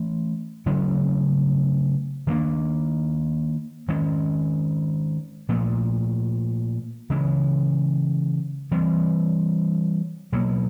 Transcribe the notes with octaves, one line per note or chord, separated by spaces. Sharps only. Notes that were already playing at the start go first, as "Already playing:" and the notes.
Already playing: E3 A3 C#4
C#3 F#3 A3 C#4
D#3 F#3 A#3 D4
D#3 G#3 C#4
A#2 F3 A3
C#3 E3 G#3
E3 G3 C4
B2 F#3 A#3